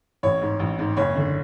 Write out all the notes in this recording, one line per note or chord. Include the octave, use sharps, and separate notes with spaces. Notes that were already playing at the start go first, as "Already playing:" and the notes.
A1 C#5
G#2
A1
G#2
F#1 C#5
D3